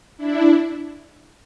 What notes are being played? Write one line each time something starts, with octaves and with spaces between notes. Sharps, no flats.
D4 E4